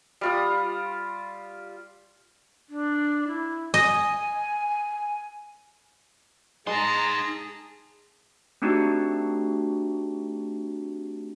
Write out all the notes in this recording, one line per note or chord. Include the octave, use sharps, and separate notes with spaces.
G3 F4 D#6
D4
E4
D#5 G#5
G#3 D#4 G#4 A5 A#5 C6
A3 C4 D4 D#4 F#4 G4